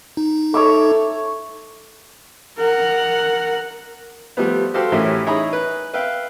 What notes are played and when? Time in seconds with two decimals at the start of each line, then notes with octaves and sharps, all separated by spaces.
0.17 D#4
0.54 A4 C#5 E5 D6
2.59 A#4 F#5
4.37 F3 G3 A3 B3
4.74 F#4 G4 A4 C5 F5 C6
4.92 A2 E3 G3 C#4 A#4 E5
5.27 D#4 E4 G#4 C#5 A#5 B5
5.53 B4
5.94 B4 E5 F5 G5